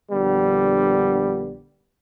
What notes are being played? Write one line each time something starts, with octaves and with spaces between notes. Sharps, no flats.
A#1 D3 G3 B3